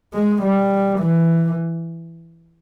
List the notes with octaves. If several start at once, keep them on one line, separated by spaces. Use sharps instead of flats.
G#3
G3
E3